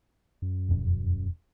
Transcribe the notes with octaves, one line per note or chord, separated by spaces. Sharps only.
F#2
E1 F2 C#4